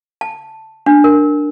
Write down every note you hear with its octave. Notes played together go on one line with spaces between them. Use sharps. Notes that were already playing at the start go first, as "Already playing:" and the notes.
A5
D4
A#4